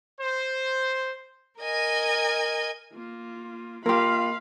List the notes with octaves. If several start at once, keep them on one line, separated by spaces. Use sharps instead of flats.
C5
A#4 D#5 G#5
A#3 F4
A#3 F4 G4 A#4 F5 B5 C6